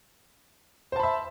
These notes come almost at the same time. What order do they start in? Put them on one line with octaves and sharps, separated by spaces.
C5 A5 B5 E5